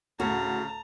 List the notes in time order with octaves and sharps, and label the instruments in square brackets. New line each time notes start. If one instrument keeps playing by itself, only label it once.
[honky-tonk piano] D2 A2 [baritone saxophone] C#3 [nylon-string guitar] F#4 [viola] A5 A#5